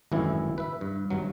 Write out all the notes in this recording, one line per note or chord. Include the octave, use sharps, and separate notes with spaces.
G#1 F#2 A2 E3 E4
B4 E5
G2
G#1 G2 F#3